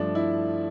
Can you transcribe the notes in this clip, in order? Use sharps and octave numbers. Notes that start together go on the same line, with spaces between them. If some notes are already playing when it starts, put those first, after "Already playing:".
Already playing: G2 F3 A3 D4
E4